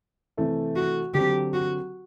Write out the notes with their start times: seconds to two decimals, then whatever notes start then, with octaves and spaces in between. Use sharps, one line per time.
0.37 C3 E3 A3 E4
0.76 F#4
1.14 D3 F#3 C4 G4
1.53 F#4